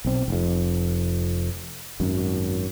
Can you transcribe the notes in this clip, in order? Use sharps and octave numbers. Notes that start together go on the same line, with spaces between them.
B1 C4
F1 F2
G#1 F#2